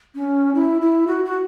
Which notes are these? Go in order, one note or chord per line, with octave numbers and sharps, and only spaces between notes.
C#4
E4
E4
F#4
F#4